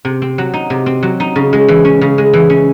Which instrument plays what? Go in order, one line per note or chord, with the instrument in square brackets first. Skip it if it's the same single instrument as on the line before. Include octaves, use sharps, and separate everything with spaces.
[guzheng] C3
C4
F#3
D#4
C3
C4
F#3
D#4
C#3
G#3
E3
C#4
C#3
G#3
E3
C#4